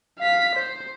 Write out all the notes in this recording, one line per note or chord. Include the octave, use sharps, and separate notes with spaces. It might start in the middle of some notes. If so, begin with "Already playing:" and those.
F5 B6
C5